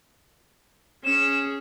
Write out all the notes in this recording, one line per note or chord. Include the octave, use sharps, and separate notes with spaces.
C#4 G#4 E7